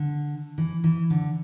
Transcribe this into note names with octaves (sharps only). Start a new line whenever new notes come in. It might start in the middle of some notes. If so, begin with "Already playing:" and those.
Already playing: D3
E3
E3
D3